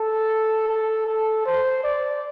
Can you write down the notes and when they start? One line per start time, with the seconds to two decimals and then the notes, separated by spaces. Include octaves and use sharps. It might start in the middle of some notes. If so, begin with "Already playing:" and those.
Already playing: A4
0.68 A4
1.07 A4
1.45 C5
1.84 D5